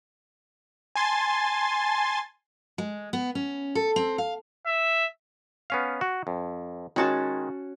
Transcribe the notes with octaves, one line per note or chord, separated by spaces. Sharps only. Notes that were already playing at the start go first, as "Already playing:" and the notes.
G#5 A5 C6 A6
G#3
B3
C#4
A4
C4
F5
E5
B3 C#4 F5
F#4
F2
D#3 G#3 C#4 F#4 A5